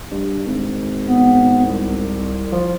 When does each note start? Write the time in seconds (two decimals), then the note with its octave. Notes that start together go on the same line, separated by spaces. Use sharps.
0.11 G2
0.47 G#1
1.07 B3
1.65 C2
2.52 F3